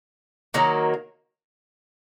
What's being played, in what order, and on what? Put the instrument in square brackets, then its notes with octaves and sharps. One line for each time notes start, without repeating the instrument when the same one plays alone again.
[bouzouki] D#3 F#3 A#3